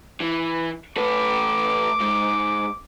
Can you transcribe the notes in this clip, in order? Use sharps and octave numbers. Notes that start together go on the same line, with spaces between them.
E3
A3 B4 D6
G#2